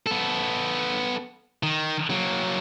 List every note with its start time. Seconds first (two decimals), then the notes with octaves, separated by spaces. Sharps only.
0.06 B3 A4
1.63 D#3
2.10 F#3 A#3